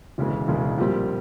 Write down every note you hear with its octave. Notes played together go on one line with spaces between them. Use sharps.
E1 D2 C#3 E3 G#3
E1 D2 C#3 E3 G#3
A#1 A#2 G3 C4